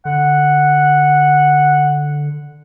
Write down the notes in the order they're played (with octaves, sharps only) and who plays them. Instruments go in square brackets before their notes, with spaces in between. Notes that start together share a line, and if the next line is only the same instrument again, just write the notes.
[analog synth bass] D3 [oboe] F#5